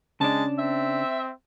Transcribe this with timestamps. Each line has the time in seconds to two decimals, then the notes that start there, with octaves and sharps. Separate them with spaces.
0.21 C#3 G#3 D4 A5
0.58 C4 E5